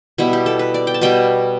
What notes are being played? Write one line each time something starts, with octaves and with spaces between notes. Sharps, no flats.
B2 G3 B3 E4
G4
A4
B4
D5
G5
A5
B2 G3 B3 G5